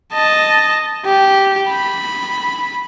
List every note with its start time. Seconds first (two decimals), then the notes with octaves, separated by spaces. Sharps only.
0.14 D#5 A5
1.05 G4
1.68 B5